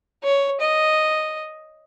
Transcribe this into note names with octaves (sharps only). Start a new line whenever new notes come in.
C#5
D#5